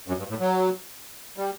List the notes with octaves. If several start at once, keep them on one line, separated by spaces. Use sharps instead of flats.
F#2
G2
A2
F#3
G3